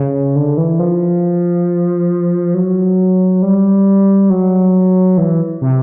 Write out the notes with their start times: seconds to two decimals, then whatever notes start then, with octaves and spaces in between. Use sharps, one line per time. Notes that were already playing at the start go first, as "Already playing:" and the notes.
Already playing: C#3
0.36 D3
0.57 E3
0.79 F3
2.54 F#3
3.43 G3
4.30 F#3
5.17 E3
5.61 C3